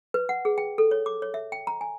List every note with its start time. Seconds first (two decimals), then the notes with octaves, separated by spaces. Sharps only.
0.14 B4
0.29 F#5
0.45 G#4
0.58 G5
0.78 A4
0.91 C#5
1.06 D6
1.22 C#5
1.34 E5
1.52 G5
1.67 A#5
1.81 G#5